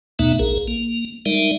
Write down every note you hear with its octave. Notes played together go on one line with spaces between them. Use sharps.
D#2 B2 A3 B3 D#4 E5
A#1 G#4 A#4
A#3
G3 G#3 D#4 A#4 D5 E5